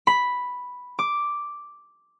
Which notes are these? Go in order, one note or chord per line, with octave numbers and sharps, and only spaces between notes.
B5
D6